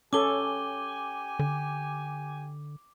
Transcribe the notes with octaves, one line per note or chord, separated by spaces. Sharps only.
C#4 G4 A4 G#5 D6 G7
D3